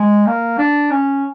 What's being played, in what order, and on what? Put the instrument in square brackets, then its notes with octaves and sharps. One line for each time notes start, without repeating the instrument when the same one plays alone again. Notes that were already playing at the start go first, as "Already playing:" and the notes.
Already playing: [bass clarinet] G#3
A#3
D4
C#4